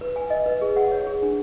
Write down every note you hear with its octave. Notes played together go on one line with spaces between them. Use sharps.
B4
G#5
D#5
B4
G#4
F#5
C#5
G#4
D4